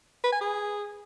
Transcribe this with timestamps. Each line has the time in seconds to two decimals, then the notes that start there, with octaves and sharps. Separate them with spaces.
0.24 B4
0.32 G#5
0.41 G#4